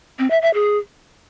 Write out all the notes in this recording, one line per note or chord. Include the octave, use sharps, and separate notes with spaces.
C4
E5
E5
G#4